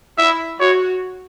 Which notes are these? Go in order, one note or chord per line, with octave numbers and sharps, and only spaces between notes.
E4 E5
F#4 C#5